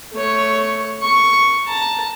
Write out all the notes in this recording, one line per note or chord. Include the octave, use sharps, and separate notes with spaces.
A3 C#5
C#6
A5 A#5